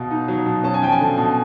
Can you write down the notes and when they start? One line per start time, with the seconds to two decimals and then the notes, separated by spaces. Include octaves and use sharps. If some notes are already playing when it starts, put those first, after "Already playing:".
Already playing: B2 F5
0.11 D#4
0.28 F#3
0.46 B2
0.64 C#4 A5
0.74 G#5
0.82 F3 G5
0.92 G#5
1.00 D3
1.18 B2